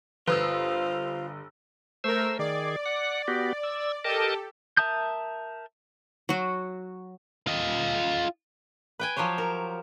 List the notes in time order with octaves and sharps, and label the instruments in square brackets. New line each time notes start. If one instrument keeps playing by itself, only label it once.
[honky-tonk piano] G1 D#6 E6 [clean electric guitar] F4 [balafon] B4 [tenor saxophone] C5
[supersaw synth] A3 A#4 [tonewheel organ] C5 E6
[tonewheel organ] D#3 G#4 [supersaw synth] D5
[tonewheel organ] F#5
B3 F#4 G4
E6
[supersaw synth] G4 A4 [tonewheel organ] A#4 D#5 A5
[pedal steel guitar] A#4 E5 A5 D#6 G6
[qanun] F#3 F#4
[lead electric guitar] F4 D#5
[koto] B4 G5 G#5
F3 F#3 G4 C5 C#5
A#4